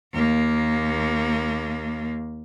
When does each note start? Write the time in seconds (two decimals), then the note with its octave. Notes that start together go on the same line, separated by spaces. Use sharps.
0.13 D#2 A#3